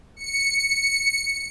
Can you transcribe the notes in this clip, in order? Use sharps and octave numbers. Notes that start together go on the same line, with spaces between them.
C#7